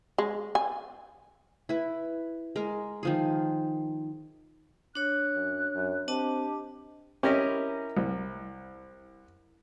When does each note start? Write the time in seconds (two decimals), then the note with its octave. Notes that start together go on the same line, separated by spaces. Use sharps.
0.18 G#3
0.55 G#5
1.69 E4 B4
2.56 G#3 A#4
3.03 D#3 F3 G#4
4.95 D4 C#5 F#6
5.35 F#2
5.75 F#2
6.08 C4 D4 G4 D#5 A5
7.23 C#4 E4 G4 A#4 D#5
7.97 C2